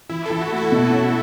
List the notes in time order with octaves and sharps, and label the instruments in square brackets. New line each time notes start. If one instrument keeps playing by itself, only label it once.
[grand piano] E3 [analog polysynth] E4
[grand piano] E3 [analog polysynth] A4
[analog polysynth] F#4
[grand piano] A3
[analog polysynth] E4
[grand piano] B2
C#4